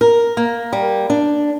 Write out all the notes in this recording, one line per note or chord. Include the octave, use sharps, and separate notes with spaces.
A#4
A#3
G3
D4